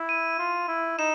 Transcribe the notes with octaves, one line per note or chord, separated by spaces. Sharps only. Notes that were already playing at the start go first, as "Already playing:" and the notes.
Already playing: E4
D#7
F4
E4
D#4 E7